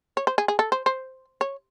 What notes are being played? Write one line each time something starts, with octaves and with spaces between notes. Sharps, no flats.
C#5
C5
G#4
G#4
A4
C5
C5
C#5